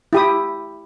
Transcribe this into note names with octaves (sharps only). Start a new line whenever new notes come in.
E4 G4 D#6